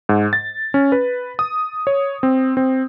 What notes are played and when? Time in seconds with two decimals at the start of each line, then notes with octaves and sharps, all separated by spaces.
0.09 G#2
0.33 A6
0.74 C#4
0.92 B4
1.39 D#6
1.87 C#5
2.23 C4
2.57 C4